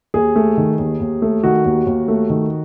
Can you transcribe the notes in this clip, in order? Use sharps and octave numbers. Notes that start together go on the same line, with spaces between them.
D#2 G#4
A3
D#3
D#2
D#2
A3
D#3 F#4
D#2
D#2
A3
D#3